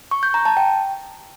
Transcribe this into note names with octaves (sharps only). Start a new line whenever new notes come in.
C#6
G6
A#5
A5
G5